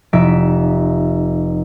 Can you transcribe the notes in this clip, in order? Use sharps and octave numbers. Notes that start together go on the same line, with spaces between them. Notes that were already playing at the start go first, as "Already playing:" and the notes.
F1 D#4 E5 B6 D7